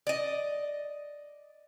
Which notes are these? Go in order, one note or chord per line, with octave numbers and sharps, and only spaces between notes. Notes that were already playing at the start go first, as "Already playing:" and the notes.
D5 D#5